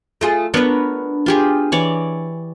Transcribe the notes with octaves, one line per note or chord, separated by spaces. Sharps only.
A3 F4 G#4
B3 D4 A#4 B4 C#5
F4 G4 G#4
E3 C#5 D5